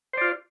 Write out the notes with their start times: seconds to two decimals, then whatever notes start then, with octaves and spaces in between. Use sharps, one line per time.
0.13 C5
0.17 D5
0.21 F4